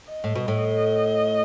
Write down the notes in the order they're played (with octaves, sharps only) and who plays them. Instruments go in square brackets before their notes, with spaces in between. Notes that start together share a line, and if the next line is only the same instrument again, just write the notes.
[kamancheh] D#5
[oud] A2
B2
A2